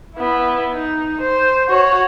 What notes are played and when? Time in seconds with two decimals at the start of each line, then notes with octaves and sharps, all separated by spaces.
0.15 B3 E4
0.74 D#4
1.20 C5
1.69 F#4 C#5